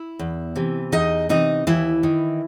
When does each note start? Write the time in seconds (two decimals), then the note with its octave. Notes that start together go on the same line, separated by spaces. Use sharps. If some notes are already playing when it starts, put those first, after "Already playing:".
Already playing: E4
0.19 E2
0.56 C3 E3
0.92 E2 D#4 D#5
1.29 C3 E3 D#4 D#5
1.67 D#2 E3 E4
2.03 D#3